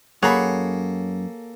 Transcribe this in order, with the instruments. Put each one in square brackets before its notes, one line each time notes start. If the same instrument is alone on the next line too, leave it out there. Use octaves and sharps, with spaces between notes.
[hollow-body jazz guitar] F#2 A#5 B5 [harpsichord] A#3 A4 [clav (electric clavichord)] G#4 C#5 F#5